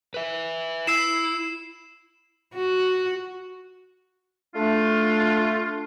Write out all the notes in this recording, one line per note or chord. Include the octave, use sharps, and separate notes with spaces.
B4 E5
E4 E6 C7 E7
F#4
A3 D4 F4